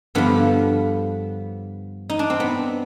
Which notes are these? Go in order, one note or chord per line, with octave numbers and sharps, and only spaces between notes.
G2 D3 F3 B3
D#4
D4
C4
B3